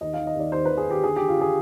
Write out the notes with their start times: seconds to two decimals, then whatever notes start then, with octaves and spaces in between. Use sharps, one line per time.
0.01 D#2 D#5
0.14 F5
0.19 D#3
0.27 D#5
0.35 D#2 D5
0.52 D#2 C5
0.65 D#3 B4
0.77 G#4
0.86 D#2 G4
1.04 D3 G#4
1.16 D3 G4
1.28 F4
1.38 D3 G#4